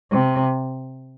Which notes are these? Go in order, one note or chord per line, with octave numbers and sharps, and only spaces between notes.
C3